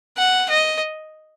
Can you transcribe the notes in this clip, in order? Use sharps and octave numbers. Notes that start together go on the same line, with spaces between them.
F#5
D#5